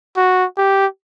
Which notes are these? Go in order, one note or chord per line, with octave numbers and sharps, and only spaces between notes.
F#4
G4